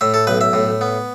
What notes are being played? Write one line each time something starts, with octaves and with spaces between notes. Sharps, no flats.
A2 E5
A4
B1 B4
E5
A2
B3